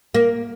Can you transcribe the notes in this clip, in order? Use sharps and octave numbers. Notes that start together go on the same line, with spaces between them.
A#3